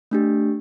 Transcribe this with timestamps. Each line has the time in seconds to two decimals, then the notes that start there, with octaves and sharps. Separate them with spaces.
0.11 A3 D4 G4